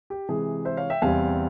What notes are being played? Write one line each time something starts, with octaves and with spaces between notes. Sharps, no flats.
G4
C3 E3 G#3 G#4
C5 E5
C#5 F5
E5 G5
E2 C3 G3 C4 F5 G#5